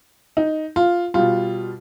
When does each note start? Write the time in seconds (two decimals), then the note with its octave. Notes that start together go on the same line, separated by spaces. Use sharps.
0.37 D#4
0.76 F4
1.14 B2 G3 F4